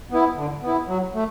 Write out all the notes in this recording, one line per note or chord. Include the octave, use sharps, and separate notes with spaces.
B3 E4
D3
B3 E4
F#3
A3